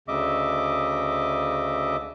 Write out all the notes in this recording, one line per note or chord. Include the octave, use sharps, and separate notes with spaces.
D2 C#3 D#5 E5 D6